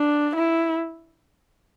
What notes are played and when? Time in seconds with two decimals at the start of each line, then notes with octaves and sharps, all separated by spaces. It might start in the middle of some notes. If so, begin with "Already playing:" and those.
Already playing: D4
0.35 E4